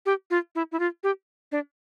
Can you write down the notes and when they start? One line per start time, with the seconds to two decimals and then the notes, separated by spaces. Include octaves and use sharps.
0.06 G4
0.30 F4
0.55 E4
0.72 E4
0.80 F4
1.03 G4
1.52 D4